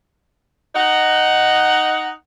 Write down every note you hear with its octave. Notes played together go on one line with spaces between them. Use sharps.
D#4 F#5